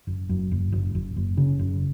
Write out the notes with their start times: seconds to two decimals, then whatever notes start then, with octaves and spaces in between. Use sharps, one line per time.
0.07 F#1
0.29 F#2
0.51 F#1
0.72 F#1
0.95 F#1
1.16 F#1
1.37 C#3
1.59 F#1